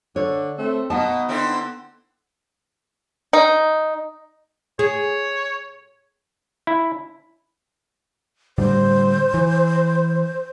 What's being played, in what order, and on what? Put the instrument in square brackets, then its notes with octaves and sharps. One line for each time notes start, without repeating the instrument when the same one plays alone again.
[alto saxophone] D3 [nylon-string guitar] C#5
[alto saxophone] A3 [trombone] C4
[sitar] B2 [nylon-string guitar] B3 F#5 A5 [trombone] D#4 [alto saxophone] D#5
[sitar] D3 C4 E4
[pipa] D#4
[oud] G#4 [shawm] C#5
[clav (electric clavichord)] E4
[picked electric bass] A2 D3 G3 [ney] C5
[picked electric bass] E3